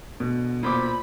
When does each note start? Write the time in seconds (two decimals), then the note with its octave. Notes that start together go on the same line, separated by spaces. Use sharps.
0.20 B2 D3
0.63 A#2 C5 B5 D6